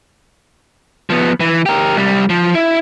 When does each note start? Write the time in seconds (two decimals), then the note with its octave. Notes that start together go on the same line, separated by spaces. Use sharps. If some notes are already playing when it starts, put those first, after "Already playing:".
1.10 F3 B3
1.40 E3
1.66 G4 A#4
1.96 C2 G3
2.30 F3
2.55 E4